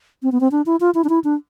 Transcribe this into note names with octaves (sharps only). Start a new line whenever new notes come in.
C4
B3
C4
D4
E4
F4
E4
D4
E4
D4